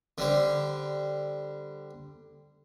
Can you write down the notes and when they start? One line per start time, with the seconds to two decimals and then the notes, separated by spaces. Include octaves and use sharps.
0.18 D3 G3 C5